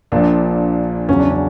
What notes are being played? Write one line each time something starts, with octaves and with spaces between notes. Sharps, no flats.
A#1 A#2 F3 D4
E2 C#3 F#3 C#4
D4
C#4